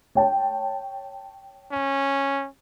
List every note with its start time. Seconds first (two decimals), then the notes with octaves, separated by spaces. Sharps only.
0.15 C#5 G5 A5
1.72 C#4